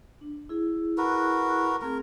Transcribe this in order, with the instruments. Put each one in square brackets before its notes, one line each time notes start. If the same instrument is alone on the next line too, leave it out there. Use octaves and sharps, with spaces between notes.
[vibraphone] D4
E4 G#4
[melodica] F#4 A#4 B4
[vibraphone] A3 C4 G#4 [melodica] A#4